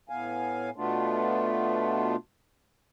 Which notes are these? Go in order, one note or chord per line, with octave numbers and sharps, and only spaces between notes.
A2 B3 F5 G#5
B2 A3 B3 D4 F4